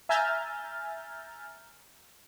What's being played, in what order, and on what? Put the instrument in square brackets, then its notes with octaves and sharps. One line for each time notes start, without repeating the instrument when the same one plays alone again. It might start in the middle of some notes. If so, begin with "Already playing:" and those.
[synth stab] E5 G#5 A#5 F6 G6 A6